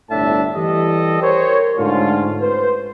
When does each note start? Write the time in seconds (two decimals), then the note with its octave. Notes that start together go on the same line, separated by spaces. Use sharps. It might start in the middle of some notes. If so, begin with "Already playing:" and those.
0.10 G1 C2 A2 D4 E5 A5
0.54 E3 G3 G4 A4 D#5
1.21 A#4 C5 C#5
1.78 G#2 D3 A3 C#4 F4
2.40 B4 C5